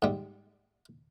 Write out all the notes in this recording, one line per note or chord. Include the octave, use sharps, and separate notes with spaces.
G#2 G3